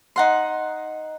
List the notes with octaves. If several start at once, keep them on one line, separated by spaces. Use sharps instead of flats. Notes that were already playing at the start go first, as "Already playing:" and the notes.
D#4 F#5 C6